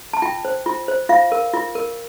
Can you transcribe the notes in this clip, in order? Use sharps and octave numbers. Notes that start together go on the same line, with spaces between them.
A5
F4 G5
C5
F4
C5
F4 F5
A#4
F4
A#4